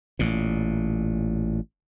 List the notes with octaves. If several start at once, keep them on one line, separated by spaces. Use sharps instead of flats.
A1 A#2